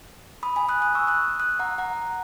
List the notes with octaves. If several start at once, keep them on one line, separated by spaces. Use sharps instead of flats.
B5 D#6
G#5 B5
D#6 F#6
D#6 F#6
C#6 E6
D#6 F#6
D#6 F#6
F#5 A#5
F#5 A#5